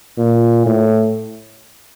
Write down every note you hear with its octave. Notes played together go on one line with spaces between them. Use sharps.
A#2
A2